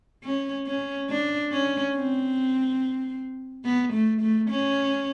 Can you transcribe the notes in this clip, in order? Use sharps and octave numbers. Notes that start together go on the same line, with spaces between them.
C#4
C#4
D4
C#4
C4
B3
A3
A3
C#4